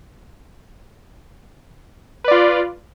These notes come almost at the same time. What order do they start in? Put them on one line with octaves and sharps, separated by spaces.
B4 D5 F4